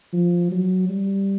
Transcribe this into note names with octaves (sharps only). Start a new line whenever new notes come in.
F3
F#3
G3